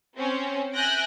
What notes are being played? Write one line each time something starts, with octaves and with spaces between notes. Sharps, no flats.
C4 C#4
E5 G#5 F#6 G6 A#6 D7